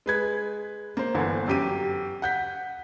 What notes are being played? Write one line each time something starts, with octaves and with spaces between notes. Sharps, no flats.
G#3 B4 G#6
A#3 C5
G1 D3 E3
F#2 G4 D#7
F#5 G6 B6